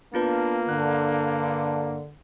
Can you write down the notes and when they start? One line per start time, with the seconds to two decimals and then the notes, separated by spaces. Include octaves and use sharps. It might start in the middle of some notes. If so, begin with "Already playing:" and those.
0.14 A#3 B3 D4 F4 B4
0.69 G2 D3 F#6